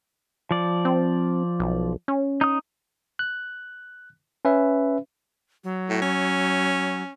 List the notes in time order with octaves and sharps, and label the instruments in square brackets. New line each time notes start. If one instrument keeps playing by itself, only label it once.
[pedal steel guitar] F3 D5
[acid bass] C4
B1
C#4
[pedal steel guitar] D#4 D#6
[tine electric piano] F#6
C#4 B4 E5
[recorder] F#3
[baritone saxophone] A2
C#4